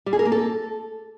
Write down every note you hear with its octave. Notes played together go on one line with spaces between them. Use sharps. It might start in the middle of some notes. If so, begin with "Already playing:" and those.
G3
G#4
A#4
A#3
A4